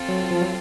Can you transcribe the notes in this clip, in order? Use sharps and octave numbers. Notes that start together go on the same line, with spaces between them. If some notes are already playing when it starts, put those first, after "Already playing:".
Already playing: C4 F4 A4
F#3
F3
F#3